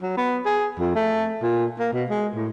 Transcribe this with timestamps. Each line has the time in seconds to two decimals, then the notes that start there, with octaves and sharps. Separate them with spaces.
0.02 F#3
0.17 B3
0.46 G#4
0.79 F2
0.95 A3
1.42 A#2
1.79 A#3
1.93 B2
2.10 G#3
2.35 A2